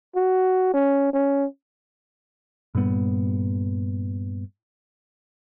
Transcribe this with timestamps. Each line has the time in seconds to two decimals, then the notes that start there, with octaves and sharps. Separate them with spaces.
0.16 F#4
0.74 C#4
1.13 C#4
2.75 G2 A#2 G3 B3